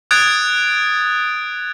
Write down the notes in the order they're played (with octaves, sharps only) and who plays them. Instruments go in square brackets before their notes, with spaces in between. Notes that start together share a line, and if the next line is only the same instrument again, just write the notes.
[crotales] D#6 F#6 G#6 A6 D7